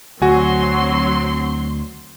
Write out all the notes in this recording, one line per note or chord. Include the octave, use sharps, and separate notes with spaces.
D2 F#3 C4 F#4 G#5 C6